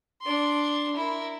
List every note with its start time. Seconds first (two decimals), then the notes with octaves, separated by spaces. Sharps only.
0.22 D4 C6
0.96 E4 A#4